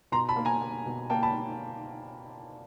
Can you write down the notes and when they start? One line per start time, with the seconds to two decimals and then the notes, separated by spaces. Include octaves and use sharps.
0.12 B2 A#5 C6
0.29 A5 B5
0.36 A#3
0.45 G#5 A#5
0.61 A#3
0.86 B2
1.10 A#3 G5 A5
1.23 A5 B5